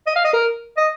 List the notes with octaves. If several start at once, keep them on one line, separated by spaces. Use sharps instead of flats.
D#5
F5
D#5
A#4
D#5